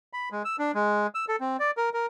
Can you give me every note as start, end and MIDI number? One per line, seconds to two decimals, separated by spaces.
0.13 0.29 83
0.32 0.42 56
0.45 0.56 88
0.59 0.71 62
0.75 1.07 56
1.15 1.25 88
1.28 1.36 69
1.41 1.57 60
1.60 1.71 74
1.77 1.89 70
1.94 2.06 70